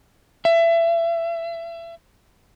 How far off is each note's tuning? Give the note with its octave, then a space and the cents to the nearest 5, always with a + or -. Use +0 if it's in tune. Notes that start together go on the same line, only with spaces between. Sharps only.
E5 +30